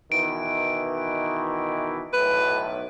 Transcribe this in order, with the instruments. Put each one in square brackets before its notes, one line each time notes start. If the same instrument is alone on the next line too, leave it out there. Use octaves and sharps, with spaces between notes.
[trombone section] B2 D#3 E3 [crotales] D7
[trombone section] B1 A2 [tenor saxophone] B4